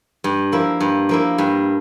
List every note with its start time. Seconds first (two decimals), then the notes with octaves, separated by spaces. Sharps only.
0.24 G2
0.52 F3 A#3 E4
0.80 G2
1.09 F3 A#3 E4
1.38 G2